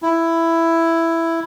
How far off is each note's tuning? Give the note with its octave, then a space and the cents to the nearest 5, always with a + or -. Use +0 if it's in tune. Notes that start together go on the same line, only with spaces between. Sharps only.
E4 +5